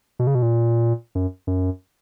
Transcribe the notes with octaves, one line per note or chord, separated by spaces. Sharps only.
B2
C#3
B2
A#2
F#2
F#2